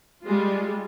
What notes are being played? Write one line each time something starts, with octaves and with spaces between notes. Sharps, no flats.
G3 G#3 F4